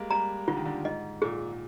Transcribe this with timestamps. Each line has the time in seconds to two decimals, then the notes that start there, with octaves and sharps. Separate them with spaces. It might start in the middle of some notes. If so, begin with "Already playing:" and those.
Already playing: G3 G#3 A#3
0.10 G3 A#5
0.48 D3 F4
0.57 D#3
0.65 D3
0.85 G#2 D#5
1.22 A#2 G#4
1.52 A#2